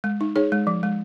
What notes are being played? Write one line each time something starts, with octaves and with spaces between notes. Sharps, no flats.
G#3
D#4
D#4 G#4 C#5
G#3
F3
G#3